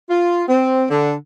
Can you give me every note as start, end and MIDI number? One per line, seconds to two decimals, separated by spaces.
0.10 0.43 65
0.49 0.85 60
0.90 1.14 50